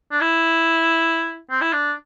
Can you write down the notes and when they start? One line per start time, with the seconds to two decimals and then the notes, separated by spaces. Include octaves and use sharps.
0.12 D4
0.21 E4
1.50 C4
1.61 E4
1.73 D4